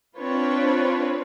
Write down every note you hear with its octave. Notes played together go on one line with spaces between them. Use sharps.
C4 D4 F4 B4 C#5